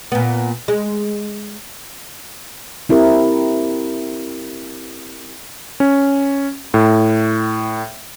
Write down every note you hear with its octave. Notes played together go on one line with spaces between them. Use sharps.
A#2 B3
G#3
C4 E4 G4 A#4
C#4
A2